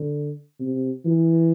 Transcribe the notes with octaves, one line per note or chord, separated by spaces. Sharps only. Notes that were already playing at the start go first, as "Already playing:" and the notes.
Already playing: D3
C3
E3